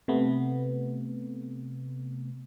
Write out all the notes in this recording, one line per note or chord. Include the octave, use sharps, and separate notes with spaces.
C3 A3 B3